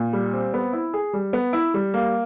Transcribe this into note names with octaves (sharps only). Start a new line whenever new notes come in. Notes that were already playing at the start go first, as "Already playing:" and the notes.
Already playing: A#2
G3
C4
B3
E4
G#4
G3
B3
E4
G3
A#3